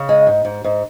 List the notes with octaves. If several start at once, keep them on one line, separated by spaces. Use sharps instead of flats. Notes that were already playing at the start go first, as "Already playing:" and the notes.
Already playing: C#3
G#3
G#2
G#2
G#2